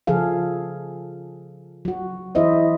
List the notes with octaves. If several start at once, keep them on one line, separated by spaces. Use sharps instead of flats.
C#3 F3 G#4 A4 F5
F#3 F#4
E3 E4 G#4 C5 D#5 E5